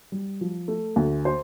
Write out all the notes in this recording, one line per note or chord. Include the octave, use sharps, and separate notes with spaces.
G3
F3
A3
D2
C5